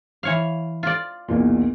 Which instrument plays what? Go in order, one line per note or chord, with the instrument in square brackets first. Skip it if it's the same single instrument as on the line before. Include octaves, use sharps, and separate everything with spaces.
[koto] E3 C#5 F5
F4 D5
[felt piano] B1 E2 A#2